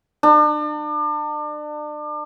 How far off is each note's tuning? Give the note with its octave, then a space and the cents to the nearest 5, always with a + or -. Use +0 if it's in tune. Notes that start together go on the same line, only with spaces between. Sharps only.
D4 +35